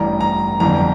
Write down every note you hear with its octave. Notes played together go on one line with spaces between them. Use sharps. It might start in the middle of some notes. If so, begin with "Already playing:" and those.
Already playing: A1 G2 E3 G3 A#5
A#5
G1 F2 E3 G3 A#5